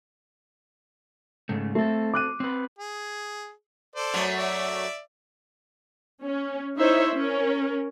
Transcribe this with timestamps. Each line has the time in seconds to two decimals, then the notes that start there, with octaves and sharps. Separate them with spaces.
1.49 G#2 C#3 A3
1.75 A3 C4 A4
2.14 D6 F#6 D#7
2.40 C4 B4
2.79 G#4
3.96 A4 C5 D5
4.13 F#2 F#3 A3
4.38 D5 E5
6.22 C#4
6.76 D#4 E4 C5 C#5 E5
7.13 C#4 A#4